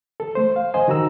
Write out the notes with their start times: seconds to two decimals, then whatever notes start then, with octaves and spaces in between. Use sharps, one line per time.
0.20 A4
0.35 A3 C5
0.56 F5
0.74 C5 D#5 G#5
0.88 D#3 F#4 A#5 E6